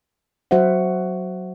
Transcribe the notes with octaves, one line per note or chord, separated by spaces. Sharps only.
F#3 F#4 C5 E5 F#5